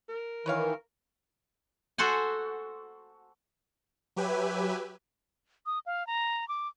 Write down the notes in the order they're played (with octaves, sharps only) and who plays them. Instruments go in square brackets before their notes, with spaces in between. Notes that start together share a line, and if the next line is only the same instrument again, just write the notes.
[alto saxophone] A#4
[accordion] D#3 E3 [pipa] B4 C#5 F5
[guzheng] F#4 A4 C5 F#5 G#5
[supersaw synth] F#3 G4 B4 E5 G#5
[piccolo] D#6
F5
A#5
D6